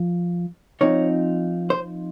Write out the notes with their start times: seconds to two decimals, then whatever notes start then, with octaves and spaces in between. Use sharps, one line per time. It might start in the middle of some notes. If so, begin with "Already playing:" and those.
Already playing: F3
0.81 F3 C4 D#4 C#5
1.70 C5